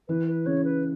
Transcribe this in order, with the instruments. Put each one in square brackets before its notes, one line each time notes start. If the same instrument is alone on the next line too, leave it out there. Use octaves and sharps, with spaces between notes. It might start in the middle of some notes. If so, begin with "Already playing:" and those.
[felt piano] E3 [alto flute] B4
[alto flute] B4
[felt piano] C#3 [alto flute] C#5
[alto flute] B4